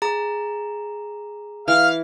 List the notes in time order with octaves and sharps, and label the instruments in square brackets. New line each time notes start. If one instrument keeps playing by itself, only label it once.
[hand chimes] G#4 A#5
[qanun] E3 [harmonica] F5 F6